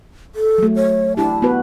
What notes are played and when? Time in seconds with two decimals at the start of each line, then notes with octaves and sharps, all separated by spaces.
0.35 A4
0.58 F#3 A3
0.76 C#5
1.17 D4 E4 G4 A5
1.42 B3 F#4 B4